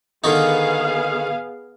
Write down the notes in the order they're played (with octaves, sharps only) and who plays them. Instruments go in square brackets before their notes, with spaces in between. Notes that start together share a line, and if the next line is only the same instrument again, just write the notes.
[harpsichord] D3 D#3 D#4 [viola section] B3 G#4 F5